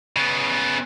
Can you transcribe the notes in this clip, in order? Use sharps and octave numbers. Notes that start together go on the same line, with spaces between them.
C#3 B3